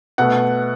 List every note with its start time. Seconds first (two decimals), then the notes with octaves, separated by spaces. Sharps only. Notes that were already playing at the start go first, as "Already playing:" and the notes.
0.18 B2 A3 F#5